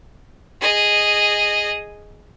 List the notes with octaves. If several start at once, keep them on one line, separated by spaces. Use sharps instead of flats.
G#4 D#5